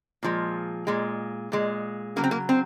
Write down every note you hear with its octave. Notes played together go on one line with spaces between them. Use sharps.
A#2 F3 G#3
A#2 G#3
A#2 G#3
C#3 F#3 A#3
C4
A#3
C4